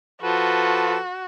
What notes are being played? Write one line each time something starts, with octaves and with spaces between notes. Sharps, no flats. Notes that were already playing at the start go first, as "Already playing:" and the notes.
F3 F#4 A4 B4